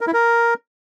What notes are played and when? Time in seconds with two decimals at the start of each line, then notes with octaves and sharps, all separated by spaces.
0.01 A#4
0.07 E4
0.14 A#4